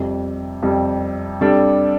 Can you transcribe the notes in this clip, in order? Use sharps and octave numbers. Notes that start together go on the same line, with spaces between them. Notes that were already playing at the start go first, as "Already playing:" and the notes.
Already playing: F2 C3 G3
F2 C3 G3
C3 G3 D4 A4